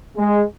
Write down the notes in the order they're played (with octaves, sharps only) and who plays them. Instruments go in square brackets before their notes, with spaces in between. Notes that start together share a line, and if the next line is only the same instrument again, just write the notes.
[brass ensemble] G#3